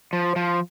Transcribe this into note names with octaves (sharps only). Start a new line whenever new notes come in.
F3
F3